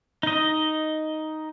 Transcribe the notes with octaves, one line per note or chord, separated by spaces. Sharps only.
D#4 D#5